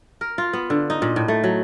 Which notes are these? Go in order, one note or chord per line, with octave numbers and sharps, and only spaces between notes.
A#4
F4
B3
D3
D#4
A#2
A2
A3
F#3